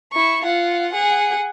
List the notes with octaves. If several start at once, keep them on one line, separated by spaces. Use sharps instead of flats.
E4 C#6
F4 F#5
G#4 F#5